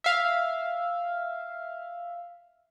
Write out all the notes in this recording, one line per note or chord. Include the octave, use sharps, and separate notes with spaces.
E5 F5